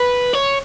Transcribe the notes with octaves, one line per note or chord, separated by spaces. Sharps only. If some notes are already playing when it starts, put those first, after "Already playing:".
Already playing: B4
C#5